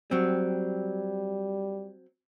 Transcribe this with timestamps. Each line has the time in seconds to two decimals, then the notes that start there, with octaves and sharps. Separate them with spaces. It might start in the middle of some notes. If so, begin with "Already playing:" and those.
0.11 F#3 G3 C4